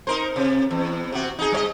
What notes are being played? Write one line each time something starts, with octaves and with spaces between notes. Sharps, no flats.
D#4 A#4 C5
C3
E2
C3 F#4
D#4 G#4
G3 C#5 D#5